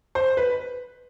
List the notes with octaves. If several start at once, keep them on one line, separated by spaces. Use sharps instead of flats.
C5
B4